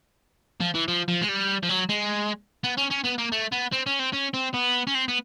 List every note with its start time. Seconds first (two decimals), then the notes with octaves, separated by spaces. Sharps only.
0.60 F3
0.74 E3
0.88 F3
1.08 F3
1.22 G#3
1.29 G3
1.63 F3
1.69 F#3
1.89 G#3
2.64 B3
2.78 C#4
2.91 C#4
3.05 B3
3.19 A#3
3.32 A3
3.52 B3
3.72 C4
3.86 C#4
3.99 C4
4.13 C#4
4.34 C4
4.54 B3
4.87 C#4
4.95 C4
5.08 B3